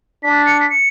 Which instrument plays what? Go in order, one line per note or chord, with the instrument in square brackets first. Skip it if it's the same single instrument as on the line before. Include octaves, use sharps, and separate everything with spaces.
[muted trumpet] D4 [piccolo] B6
[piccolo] C#7
B6
C#7